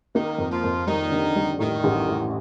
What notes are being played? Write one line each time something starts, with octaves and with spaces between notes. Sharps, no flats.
D#3 A#3 D#4
F2
F3 F4
F2
D#3 G3 D#4
D3
G3
A2 D#3 D#4
A1
A2